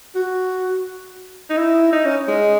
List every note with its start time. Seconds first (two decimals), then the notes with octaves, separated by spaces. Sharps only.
0.15 F#4
1.50 D#4
1.57 E4
1.93 D#4
2.05 C#4
2.28 G#3